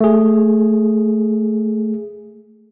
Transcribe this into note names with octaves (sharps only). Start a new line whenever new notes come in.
A3 G#4